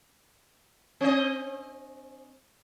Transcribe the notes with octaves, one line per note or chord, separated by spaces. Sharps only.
C4 D#5